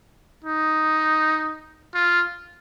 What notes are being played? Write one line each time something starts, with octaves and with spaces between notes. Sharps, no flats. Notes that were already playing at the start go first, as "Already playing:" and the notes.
D#4
F4